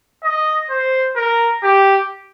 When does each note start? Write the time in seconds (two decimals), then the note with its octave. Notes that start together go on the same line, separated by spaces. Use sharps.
0.23 D#5
0.70 C5
1.16 A#4
1.63 G4